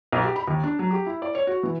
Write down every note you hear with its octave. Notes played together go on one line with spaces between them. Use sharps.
B1
G4
B5
D#2
D4
F#3
G4
E4
D5
C#5
F#4
E3